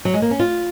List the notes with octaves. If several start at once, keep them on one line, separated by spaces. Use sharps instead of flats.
F#3
G#3
A#3
C#4
F4